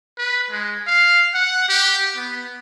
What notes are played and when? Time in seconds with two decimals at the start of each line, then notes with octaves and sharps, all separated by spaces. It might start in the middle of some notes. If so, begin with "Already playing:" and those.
0.18 B4
0.51 G#3
0.87 F5
1.34 F#5
1.69 G4
2.16 B3